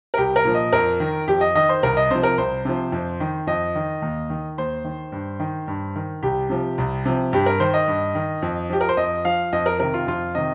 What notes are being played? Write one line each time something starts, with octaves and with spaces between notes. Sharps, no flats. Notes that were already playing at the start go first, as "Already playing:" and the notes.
A#4
C2 G4
A#4
A#2 F3
D#5
F2 A#4
D#3
F2 G4
D#5
D#3 D#5
C5
C2 A#4
D#5
C3 F3 C5
A#4
C2 C5
C3 F3
F2
D#3
F2 D#5
D#3
D#2
D#3
D#2 C5
D#3
G2
D#3
G2
D#3
C2 G4
C3 F3
C2
C3 F3
G2 G4
A#4
D#3 C5
D#5
G2
D#3
F2
F3 G4
A#4
C5
F2 D#5
F3 F5
F2 D#5
A#4
C3 D#3 A#4
F4
F2 F4
C3 D#3 D#5